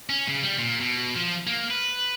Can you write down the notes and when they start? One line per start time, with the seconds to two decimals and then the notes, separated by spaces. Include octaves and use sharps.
0.10 C#4
0.29 C#3
0.43 G3
0.59 A#2
0.80 B2
1.16 F3
1.47 A#3
1.70 B4